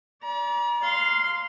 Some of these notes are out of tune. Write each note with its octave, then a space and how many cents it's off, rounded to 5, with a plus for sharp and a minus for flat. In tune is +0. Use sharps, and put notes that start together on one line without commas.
D5 -25 A#5 +40
F5 +0 C6 -15